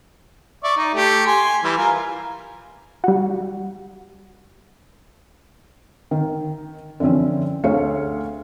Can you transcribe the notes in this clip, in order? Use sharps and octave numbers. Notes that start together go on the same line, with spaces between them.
D5 E5 C#6
D#4
A3 G4
G#5 C6
E3 G3
F4 A#4 G#5
G3 F#4
D#3
D3 E3 F3 C4 C#4
D2 A3 G#4 C#5 F5 C#7